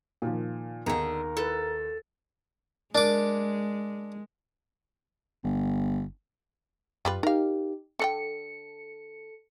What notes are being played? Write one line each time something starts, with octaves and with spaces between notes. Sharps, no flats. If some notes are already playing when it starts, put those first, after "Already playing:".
A#2 D#3 F3 A#3
D#2 D3 B3 D#4 G#4 A#4 A#5
E4 A4 B4
G#3 D4 A#4 D6
G1
F#2 G3 F4 B4
D#4 G4 A#4 F5
D3 D4 A4 G5 C#7